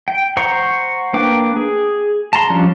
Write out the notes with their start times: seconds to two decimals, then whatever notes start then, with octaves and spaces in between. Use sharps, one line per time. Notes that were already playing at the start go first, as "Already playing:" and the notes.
0.08 G5
0.37 C5 F#5 A#5 C6 C#6
1.13 A#3 D4 B4 G5 D6
1.56 G#4
2.33 A5 A#5 C6
2.50 F3 G3 C#4 D4